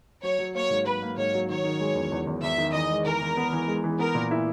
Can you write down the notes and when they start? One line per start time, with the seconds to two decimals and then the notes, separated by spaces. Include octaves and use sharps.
0.23 F#3 C#5
0.39 F#3
0.55 A#3 C#5
0.70 G#2
0.86 F#3 B4
1.02 A#3
1.17 G#2 C#5
1.34 F#3
1.49 D#3 C#5
1.65 D#3
1.80 G#3
1.96 E2
2.12 E2
2.27 E2
2.43 E2 E5
2.58 D#3
2.74 E3 D#5
2.90 G#3
3.06 E3 A#4
3.22 E3
3.37 B3
3.53 E3
3.68 G#3
3.84 E3
3.99 B3 A#4
4.15 A#2
4.31 E4